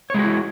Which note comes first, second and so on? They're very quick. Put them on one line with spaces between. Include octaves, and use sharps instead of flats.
C#5 G#3 F#4 E4